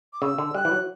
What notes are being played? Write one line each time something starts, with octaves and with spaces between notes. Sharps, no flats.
D6
C#3 E6
D3
G3 F#6
E3
F#3